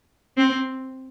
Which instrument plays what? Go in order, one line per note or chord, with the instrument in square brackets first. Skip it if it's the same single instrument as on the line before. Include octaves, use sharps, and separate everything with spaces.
[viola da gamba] C4